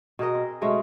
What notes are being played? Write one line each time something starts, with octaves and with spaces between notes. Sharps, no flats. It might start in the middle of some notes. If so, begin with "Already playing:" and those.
B2 G#4 A#4 D#5
C4
B2 G#3 A3 C#4